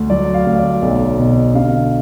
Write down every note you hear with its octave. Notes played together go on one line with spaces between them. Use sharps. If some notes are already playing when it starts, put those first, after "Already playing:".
Already playing: D2
F#3 D5
F5
D2
D5
B1
B2
D3 F5